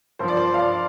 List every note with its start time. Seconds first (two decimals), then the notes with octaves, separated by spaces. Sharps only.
0.19 G2 F3 C5
0.28 D5
0.37 C5
0.54 F5
0.59 D5